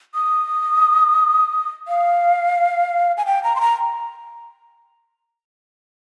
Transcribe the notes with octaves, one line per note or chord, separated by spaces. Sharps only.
D#6
F5
G#5
G5
A#5
C6
A#5